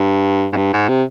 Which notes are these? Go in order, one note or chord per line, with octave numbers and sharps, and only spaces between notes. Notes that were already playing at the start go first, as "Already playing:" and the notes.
Already playing: G2
G#2
G2
G#2
C3